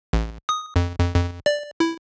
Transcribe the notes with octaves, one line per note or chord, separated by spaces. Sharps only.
A1
D#6
F2
F2
F2
D5
E4